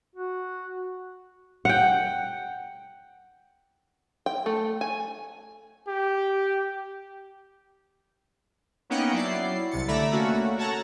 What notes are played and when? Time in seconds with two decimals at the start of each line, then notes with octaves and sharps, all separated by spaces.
0.15 F#4
1.65 F#5 G5
4.26 G5
4.46 A3
4.81 G#5
5.88 G4
8.90 A#3 B3 C#4 D#4 F#5 G5
9.13 F#3 E4 D5 C7
9.71 C2 C3 A6 C#7
9.88 D3 A3 D5 E5 A#5 B5
10.12 A3 A#3 C#4 F#4
10.57 F#4 A4 C#5 F#5 A5 A#5